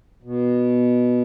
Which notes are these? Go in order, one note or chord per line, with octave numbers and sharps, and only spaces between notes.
B2